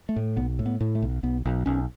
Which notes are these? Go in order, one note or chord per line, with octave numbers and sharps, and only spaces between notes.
A3
A2
B1 B3
A2
B3
A2
A3
B1
B1 B3
B1
B1 C#4